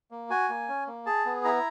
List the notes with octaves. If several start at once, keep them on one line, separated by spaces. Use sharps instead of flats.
A#3
F#4 G#5
A#3
C#4
A#3
G#4 A5
B3
E4 A#5